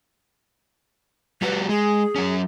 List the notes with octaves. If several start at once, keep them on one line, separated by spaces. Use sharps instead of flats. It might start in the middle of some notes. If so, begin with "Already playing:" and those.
G3 F#4 B4
G#3 G#4
F#3 C#4